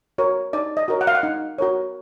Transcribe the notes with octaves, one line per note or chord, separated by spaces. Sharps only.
F#4 A#4 C#5
D#4 D5
D#5
F#4 A#4 C#5
F#5
F5
F#5
D#4
F#4 A#4 C#5